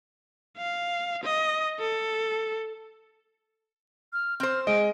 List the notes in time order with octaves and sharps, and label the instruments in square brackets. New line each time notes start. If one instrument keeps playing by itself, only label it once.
[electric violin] F5
D#5
A4
[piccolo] F6
[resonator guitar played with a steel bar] C4 C5 [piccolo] F6
[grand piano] G#3 [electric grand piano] D#5 [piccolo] D7